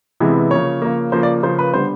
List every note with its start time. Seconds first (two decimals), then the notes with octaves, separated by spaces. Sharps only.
0.20 C3 E3 G#3 B3
0.51 C#3 F3 A#3 C#5
0.82 C#3 F3 A#3
1.12 C#3 F3 A#3 C5
1.23 D5
1.43 C#3 F3 A#3 C5
1.59 B4
1.74 D3 G3 B3 C5